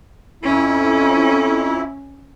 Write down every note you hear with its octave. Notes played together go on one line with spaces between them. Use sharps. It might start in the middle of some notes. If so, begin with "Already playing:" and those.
F2 C#4 E4